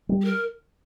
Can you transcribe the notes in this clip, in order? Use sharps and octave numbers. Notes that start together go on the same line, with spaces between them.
G3
G4
A#4